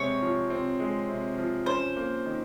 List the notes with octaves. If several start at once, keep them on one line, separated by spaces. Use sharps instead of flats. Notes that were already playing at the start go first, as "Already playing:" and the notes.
Already playing: C3 G#3 C4 C#5
F3
C4
G#3
C3
F3
C#4 C5
A#3
D#3